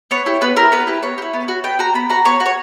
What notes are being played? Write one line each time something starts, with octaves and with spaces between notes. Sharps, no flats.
B3 C#5
E4 G4
B3 B4
E4 G4 A#4
B3 B4
E4 G4
B3 C#5
G4
E4
B3
F#4
B3 G5
F#4 A#5
B3 B5
F#4 A#5
B3 C#5
F#4
C#5